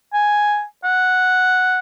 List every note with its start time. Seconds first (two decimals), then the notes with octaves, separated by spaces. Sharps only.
0.14 G#5
0.84 F#5